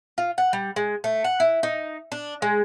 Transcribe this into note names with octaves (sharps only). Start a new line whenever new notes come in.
F4
F#5
G3
G#3
A3
F#5
E4
D#4
D4
G#3